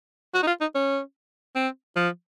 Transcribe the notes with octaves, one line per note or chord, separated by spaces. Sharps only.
F#4
D#4
F4
D#4
C#4
C4
F3